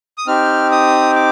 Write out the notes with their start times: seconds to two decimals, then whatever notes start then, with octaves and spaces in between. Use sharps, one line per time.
0.18 D#6
0.27 C4 D#4 G4 F6
0.72 D#6
1.16 D6